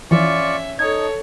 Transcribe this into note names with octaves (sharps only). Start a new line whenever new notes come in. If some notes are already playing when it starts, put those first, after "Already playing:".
E3 F3 C#4 F4 D5 E5 C#6
D#4 A4 C#5 A5 G#6